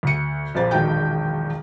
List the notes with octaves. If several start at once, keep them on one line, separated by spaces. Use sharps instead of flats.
D2 C#7
A#1 F2 A#2 C5 B5 A6
E1 A#1 D#3 F#4 G5 G6